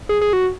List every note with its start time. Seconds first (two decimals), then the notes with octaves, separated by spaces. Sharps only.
0.09 G#4
0.21 G#4
0.33 F#4